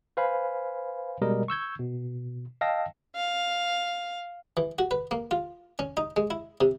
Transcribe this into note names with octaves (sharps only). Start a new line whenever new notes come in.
B4 C5 F5 G#5 B5
B2 G3 G#3 A#4 D#5
C#6 E6 G6 G#6
B2
D#5 F5 G5 A5 E6 A#6
F5
E3
F#4
B4
A#3
F4
C#4
D#4
G#3
E4
C3